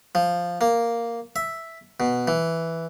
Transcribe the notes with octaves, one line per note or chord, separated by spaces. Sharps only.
F3
A#3
E5
B2
E3